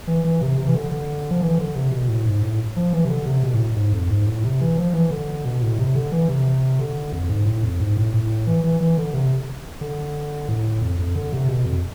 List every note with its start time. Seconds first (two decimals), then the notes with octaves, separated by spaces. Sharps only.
0.07 E3
0.24 E3
0.41 C3
0.58 C3
0.67 E3
0.74 D3
0.91 D3
1.31 F3
1.41 E3
1.58 D3
1.75 C3
1.92 B2
2.09 A2
2.26 G#2
2.43 A2
2.76 F3
2.93 E3
3.05 C3
3.09 D3
3.26 C3
3.43 B2
3.54 A2
3.76 G#2
3.93 F2
4.10 G#2
4.26 A2
4.44 C3
4.61 E3
4.78 F3
4.94 E3
5.11 D3
5.45 B2
5.62 A2
5.78 C3
5.95 D3
6.12 E3
6.28 C3
6.79 D3
7.12 F2
7.29 G#2
7.46 A2
7.63 F2
7.80 G#2
7.97 A2
8.14 A2
8.47 E3
8.64 E3
8.81 E3
8.97 D3
9.14 C3
9.81 D3
10.48 A2
10.82 F2
10.99 F2
11.15 D3
11.32 C3
11.49 B2
11.66 F2